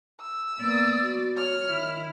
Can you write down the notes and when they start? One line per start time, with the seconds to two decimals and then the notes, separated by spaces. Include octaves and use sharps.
0.21 E6
0.60 A#3 B3 D5
1.02 F#4
1.37 C#5 F6
1.69 D#3 E4